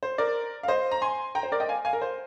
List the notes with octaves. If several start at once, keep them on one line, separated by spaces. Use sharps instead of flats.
C5
A#4 D5
F5
C5 D#5
A#5
G#5 C6
G5 A#5
C5
A#4 D5
D#5 G5
F5 G#5
F5 G#5
A#4
C5